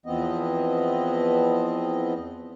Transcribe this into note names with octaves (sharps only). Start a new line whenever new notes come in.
E2 E3 F3 B3 C4 D#5